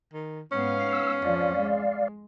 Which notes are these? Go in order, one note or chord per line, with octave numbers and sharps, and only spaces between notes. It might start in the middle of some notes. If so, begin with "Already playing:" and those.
D#3
G#2 B3 C#4 F5
E6
F2 F3 D5 F5
G#3